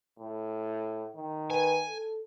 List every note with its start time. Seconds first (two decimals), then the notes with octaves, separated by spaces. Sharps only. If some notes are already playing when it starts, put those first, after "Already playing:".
0.20 A2
1.16 D#3
1.50 B4 G#5
1.88 A4